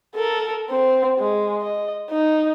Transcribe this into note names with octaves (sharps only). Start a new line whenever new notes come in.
A4 A#4
C4
G#3
D#5
D#4